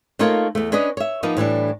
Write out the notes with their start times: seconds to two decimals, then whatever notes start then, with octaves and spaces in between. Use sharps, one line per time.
0.19 A3 A#3 D#4 F4 A#4 C#5
0.55 E2 A3
0.72 C#4 D4 B4 C#5 D#5
0.97 C#5 E5
1.23 F3 A#3 B3 D#4
1.37 A2 E3 G3 D4